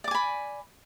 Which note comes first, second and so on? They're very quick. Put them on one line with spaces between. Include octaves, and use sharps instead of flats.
D5 D6 G#5 B5